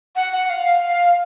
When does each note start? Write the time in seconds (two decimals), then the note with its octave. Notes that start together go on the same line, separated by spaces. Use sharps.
0.16 F#5
0.33 F#5
0.50 F5